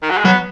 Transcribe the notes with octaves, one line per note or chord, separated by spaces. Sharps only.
D#3
F#3
G#3
F#3 B3